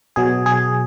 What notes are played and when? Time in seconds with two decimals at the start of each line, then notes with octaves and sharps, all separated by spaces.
0.16 B2 F#3 G#4
0.46 G#4